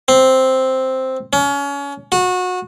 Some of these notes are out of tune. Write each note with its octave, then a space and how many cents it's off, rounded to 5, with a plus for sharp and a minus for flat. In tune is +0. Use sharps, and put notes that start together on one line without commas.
C4 +0
C#4 +30
F#4 -25